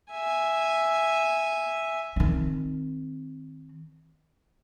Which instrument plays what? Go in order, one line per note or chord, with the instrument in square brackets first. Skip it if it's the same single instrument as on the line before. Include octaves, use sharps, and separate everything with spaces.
[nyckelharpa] E5 G#5
[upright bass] D#3 C4